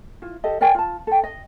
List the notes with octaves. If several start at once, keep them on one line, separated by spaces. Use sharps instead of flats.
E4 F4
G4 A4 D#5
A#4 D5 G5 G#5
F4 A5
A4 G5
D#5